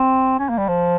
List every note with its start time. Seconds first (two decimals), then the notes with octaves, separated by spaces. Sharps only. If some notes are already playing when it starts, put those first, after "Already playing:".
Already playing: C4
0.39 C#4
0.49 A#3
0.58 G3
0.68 F3